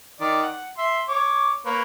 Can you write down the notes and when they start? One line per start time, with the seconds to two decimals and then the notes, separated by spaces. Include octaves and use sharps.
0.21 D#3 D5
0.43 F#5
0.78 E5 C6
1.09 C#5 D6
1.66 A#3 B4 C#5